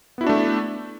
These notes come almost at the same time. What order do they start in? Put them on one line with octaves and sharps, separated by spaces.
B3 E4 F#4 D4 A3